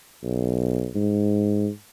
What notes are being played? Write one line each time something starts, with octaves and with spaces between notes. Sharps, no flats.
B1
G#2